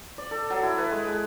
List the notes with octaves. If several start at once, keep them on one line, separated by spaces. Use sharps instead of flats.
D5
A4
F#3
E4
B4
G#3
G#4